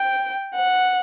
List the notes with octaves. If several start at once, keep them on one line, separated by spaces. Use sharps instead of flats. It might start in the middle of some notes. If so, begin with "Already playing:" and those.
Already playing: G5
F#5